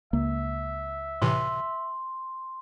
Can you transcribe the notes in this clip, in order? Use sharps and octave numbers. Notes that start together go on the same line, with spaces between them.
C#2 A#3 E5
A2 C3 E3 C6